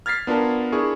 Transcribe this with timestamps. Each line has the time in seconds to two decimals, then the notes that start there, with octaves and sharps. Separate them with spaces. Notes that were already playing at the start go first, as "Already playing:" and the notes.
0.06 F6 G#6 A6 B6 C7
0.27 B3 D4 F4 A#4 A5
0.72 D4 E4 G#4 A#4 C#6